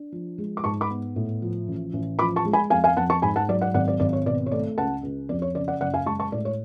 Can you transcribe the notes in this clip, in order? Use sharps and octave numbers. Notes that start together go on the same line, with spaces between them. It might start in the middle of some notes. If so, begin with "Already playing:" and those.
Already playing: D4
F3
G#3
D6
G#2 A5 C#6
B5 D6
B3
A2
F3
A1
A1
F3 B5 D6
A5 C#6
G#3
G#5 B5
F2 F5 G#5
F5 G#5
F2 F#5 A5
A5 C#6
G#2 G#5 B5
F#5 A5
F#3 D5
D5 F#5
G#1 D5 F#5
D5
G#1 D5
C#5
B2 D5
C#5
A3 D5
C#2 F#5 A5
C#2
F2 D5
C#5
C#3 D5
D5 F#5
F#1 D5 F#5
F5 G#5
G#3 A5 C#6
A5 C#6
A2 D5
C#5